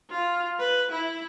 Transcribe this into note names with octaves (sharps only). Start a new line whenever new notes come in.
F4
B4
E4